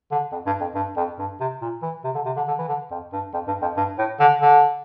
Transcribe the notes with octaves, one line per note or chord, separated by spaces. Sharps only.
D3
F2
G2
F2
G2
F2
G2
C3
A#2
E3
C3
D3
C3
D3
D3
E3
D3
F2
G2
F2
G2
F2
G2
A2
D3
D3